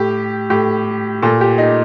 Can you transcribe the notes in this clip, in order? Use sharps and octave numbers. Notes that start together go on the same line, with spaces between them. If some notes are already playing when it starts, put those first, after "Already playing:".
Already playing: A2 G4
A2 G4
A#2 A4
G4
D#4